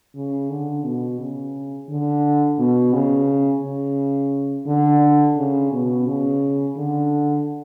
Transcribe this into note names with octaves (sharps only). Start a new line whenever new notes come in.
C#3
D3
B2
C#3
D3
B2
C#3
C#3
D3
C#3
B2
C#3
D3